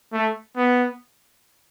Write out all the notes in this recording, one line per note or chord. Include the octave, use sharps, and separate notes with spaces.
A3
B3